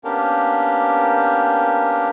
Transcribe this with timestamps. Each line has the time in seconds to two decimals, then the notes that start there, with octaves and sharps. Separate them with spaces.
0.04 A#3 B3 C#4 D4 G4 A#4